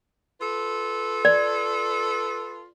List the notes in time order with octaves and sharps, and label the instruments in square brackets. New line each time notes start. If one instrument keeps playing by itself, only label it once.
[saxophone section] F4 A4 B4
[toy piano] D5